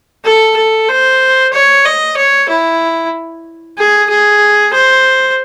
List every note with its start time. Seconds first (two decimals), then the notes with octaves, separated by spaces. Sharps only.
0.24 A4
0.56 A4
0.88 C5
1.53 C#5
1.85 D#5
2.17 C#5
2.49 E4
3.78 G#4
4.10 G#4
4.74 C5